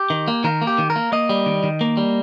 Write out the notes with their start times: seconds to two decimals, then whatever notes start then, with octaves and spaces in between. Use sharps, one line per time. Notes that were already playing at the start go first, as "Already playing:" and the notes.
Already playing: G4
0.10 D#3
0.28 A#3
0.44 D#3 A#4
0.62 A#3
0.67 G4
0.78 D#3
0.90 A#4
0.96 A#3
1.12 A#3 D#5
1.29 G3
1.46 D#3
1.63 D#3
1.81 A#3
1.97 G3